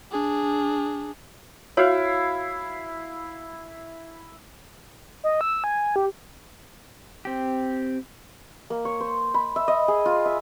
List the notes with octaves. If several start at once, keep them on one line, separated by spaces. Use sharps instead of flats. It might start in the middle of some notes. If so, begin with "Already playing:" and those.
D4 G#4
E4 F#4 C#5 F5
D#5
E6
G#5
G4
C4 G4
A#3
C#5
C5
B5
E5
D#5
G#4
F4
E5